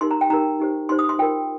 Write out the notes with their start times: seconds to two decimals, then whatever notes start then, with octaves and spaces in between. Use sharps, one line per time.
0.01 D#4 G4 A#4 C6
0.11 A#5
0.21 G5
0.30 D#4 G4 A#4 A#5
0.60 D#4 G4 C5
0.89 D#4 G4 C5 C6
0.99 D#6
1.09 C6
1.19 F4 A#4 G5